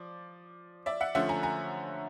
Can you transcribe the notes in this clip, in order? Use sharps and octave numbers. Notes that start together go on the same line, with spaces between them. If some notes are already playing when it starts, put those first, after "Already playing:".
Already playing: F3 D5
D5 E5
E5 F#5
D3 F3 A3 C#4 E5 F#5
G#5 A#5
G#5 A#5